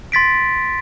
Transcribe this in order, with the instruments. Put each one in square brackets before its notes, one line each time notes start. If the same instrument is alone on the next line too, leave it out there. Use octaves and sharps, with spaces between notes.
[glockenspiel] C6 A6 B6 D7